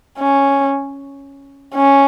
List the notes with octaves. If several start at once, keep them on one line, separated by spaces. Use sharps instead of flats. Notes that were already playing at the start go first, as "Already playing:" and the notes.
C#4
C#4